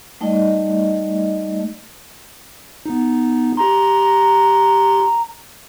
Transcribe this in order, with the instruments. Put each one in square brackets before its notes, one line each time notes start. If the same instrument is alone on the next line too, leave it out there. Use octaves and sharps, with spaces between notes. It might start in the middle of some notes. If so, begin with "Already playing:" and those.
[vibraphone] G3 A3 D#4 D5 D#5
[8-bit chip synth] B3 D#4
[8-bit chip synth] G4 C6 [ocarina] A#5